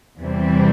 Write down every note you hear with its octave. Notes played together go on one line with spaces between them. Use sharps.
E2 C3 E3 G3 C4